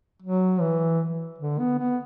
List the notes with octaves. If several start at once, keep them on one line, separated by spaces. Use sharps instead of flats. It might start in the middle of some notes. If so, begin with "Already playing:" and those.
F#3
E3
D3
B3
B3